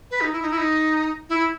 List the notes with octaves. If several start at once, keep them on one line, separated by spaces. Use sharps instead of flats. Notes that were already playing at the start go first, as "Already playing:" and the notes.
B4
D#4
E4
D#4
E4
D#4
E4